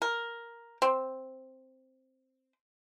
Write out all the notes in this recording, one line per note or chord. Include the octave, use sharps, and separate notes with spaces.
A#4
C4